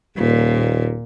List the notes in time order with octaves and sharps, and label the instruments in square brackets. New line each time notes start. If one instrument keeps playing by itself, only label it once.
[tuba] D#1 [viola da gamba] A#2